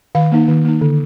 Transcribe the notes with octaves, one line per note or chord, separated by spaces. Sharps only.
D#3 F5
A#3 D#4
D#3
A#3 D#4
D3